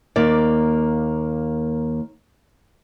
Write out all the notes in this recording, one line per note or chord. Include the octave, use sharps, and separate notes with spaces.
D#2 A#3 D5